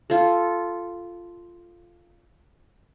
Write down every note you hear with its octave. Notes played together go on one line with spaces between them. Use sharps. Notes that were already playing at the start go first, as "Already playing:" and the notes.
F4 A4